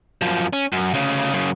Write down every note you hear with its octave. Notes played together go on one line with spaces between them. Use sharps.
F#2 F3
C#4
F#2
D2 C#3
F#2 C#3